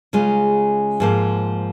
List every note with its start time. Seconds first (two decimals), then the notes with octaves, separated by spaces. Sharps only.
0.13 C#3 G#3 F4
1.00 G#2 F3 A#3